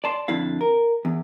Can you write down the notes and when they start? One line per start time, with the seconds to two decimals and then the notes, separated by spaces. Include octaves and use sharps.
0.04 D5 A5 C6
0.28 F2 D3 E4 F5
0.61 A#4
1.05 E2